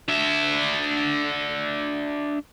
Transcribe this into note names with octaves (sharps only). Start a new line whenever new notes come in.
D4 E5